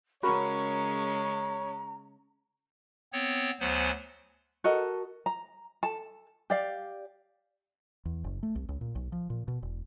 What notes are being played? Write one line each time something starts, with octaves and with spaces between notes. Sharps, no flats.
C#3 G#3 C#4 F#4 A#4 C#5 A#5 B5
B3 C4 C#5
D2 F#3 B3 C5 G#5
F#4 A4 A#4 D#5
A#5
A4 A5
G4 D5 F5
E2
F#1
A3
C2
C#2
A#2
B1
F3
A#2
B2
E1